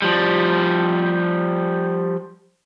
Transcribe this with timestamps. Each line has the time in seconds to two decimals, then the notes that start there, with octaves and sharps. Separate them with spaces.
0.02 F3 G3